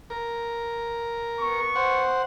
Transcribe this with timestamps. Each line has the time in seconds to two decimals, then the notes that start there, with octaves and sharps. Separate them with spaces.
0.10 A#4
1.39 B3 C#6
1.75 C5 F#5